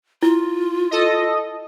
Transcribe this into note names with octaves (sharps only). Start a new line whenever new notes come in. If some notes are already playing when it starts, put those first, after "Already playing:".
E4 F4
A4 D#5